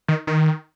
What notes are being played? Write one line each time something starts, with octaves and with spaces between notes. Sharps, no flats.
D#3
D#3